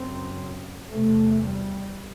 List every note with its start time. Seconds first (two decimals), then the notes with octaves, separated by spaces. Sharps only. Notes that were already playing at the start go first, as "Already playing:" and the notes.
Already playing: F#2 C#3 C4
0.90 E2 C3 A3
1.42 G3